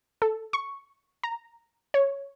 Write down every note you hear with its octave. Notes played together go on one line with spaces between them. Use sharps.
A4
C#6
A#5
C#5